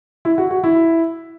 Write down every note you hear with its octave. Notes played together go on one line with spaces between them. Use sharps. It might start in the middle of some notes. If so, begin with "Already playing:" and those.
E4
F#4
F#4
E4